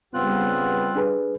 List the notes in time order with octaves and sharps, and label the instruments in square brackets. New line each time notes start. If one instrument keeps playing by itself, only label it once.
[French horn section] C#3 B3 [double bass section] G3 [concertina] C4 F4 F#6
[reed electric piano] D4 G#4 B4